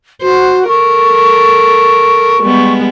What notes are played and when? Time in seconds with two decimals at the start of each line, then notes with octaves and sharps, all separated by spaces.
0.22 F#4 C5
0.68 A4 A#4 C#6
2.41 G3 G#3 B3